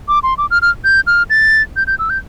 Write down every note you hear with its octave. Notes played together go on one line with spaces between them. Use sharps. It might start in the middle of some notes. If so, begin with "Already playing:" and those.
D6
C6
D6
F6
F6
G6
F6
A6
G6
G6
E6
G6